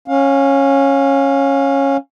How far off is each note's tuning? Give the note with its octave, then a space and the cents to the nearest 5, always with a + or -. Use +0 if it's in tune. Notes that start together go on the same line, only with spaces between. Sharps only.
C#4 -10 F5 +25